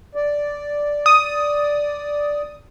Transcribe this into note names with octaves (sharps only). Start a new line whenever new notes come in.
D5
D#6